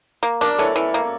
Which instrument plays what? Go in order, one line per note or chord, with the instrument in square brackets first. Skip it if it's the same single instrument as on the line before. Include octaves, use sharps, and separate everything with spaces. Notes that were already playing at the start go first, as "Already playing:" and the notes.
[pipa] A#3
[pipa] D4 [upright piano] A#4 D5
[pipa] E3 [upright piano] A4 C#5
[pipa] E3
A#3